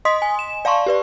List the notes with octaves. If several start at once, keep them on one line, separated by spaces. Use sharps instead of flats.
D#5 C6 D#6 B6
G#5
E7
D5 F5 A5 C6 C#6
G4 B4 D5